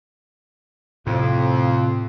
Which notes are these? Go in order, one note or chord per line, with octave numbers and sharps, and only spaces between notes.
F2 A2 C3